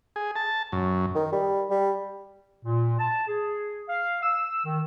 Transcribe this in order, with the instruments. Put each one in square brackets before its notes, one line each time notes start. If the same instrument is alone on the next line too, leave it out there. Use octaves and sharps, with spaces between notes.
[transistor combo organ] G#4
A5
F#2
[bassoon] D#3
G3
G3
[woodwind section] A#2
A5
G#4
F5
E6
D#3